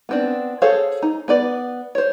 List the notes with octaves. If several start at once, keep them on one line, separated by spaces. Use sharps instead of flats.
B3 C4 D4
G#4 A4 C5 C#5 F5
D#4
B3 B4 D5
C5 C#5